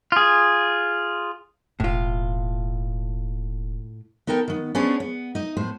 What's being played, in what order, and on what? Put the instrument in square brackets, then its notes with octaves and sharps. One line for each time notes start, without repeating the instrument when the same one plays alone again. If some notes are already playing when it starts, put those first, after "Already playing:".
[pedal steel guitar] F4 G#4
[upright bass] E1 [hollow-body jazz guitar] A2 F4
[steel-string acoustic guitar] B3 D#4 A4 A#4 G5
D#3 B3
B3 C#4 D4 G#4 C5 C#5
B3
D#4 D#5
A2 B3 C5